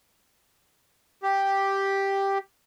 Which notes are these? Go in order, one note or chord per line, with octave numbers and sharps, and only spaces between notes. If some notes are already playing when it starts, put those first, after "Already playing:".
G4